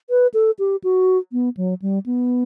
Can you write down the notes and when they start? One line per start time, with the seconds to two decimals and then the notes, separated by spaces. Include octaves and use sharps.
0.10 B4
0.34 A4
0.59 G4
0.84 F#4
1.32 B3
1.57 F#3
1.82 G3
2.06 B3